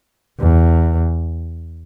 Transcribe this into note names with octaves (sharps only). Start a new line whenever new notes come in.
E2